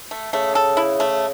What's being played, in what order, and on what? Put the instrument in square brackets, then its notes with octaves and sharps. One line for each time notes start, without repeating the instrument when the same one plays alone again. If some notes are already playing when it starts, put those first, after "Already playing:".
[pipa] A3
[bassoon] C#3 [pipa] A3
[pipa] A4
E4
A3